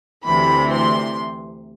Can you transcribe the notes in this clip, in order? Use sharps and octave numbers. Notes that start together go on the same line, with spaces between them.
D2 C3 E3 B5
C6